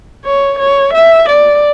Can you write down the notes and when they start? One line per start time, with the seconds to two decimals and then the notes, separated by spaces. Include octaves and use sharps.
0.25 C#5
0.59 C#5
0.94 E5
1.30 D5